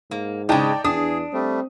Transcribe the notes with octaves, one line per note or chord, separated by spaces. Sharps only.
G#2 A#3
C#3 G#3 D#4 D5 G5 A5
E2 D4 G#4 D#6
G3 A3 C4